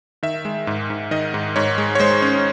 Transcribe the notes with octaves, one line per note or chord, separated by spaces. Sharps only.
D#3 E5
G#3
G#2
G#2
D#3 D#5
G#2
G#2 C#5
G#3
C#5
G#3 C5
C#4